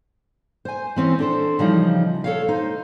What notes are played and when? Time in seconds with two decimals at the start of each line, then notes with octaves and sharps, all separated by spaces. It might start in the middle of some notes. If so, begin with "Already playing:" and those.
0.65 C5 G#5
0.96 E3 C4 C#4
1.19 D4 A4 C5
1.59 C#3 E3 F3 G3 D#4
2.24 A4 C#5 F5
2.48 D#4 C5